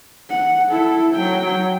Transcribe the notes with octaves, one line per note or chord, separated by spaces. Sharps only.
F#5
E4 A4
F#3 G5